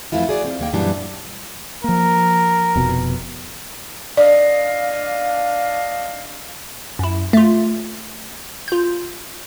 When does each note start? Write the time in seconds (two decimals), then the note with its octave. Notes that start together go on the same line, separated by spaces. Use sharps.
0.12 F2 E3 A3 E4 F4
0.27 F#4 G#4 D5
0.45 C4 F4
0.60 D#2 A#3 G5
0.73 F#2 A#2 E3 G3 D4
1.84 F3 A#3 A#4
2.76 F1 B2
4.17 D4 D5 D#5 F5
6.99 F#2 E4
7.33 A3 F4
8.68 F4 G6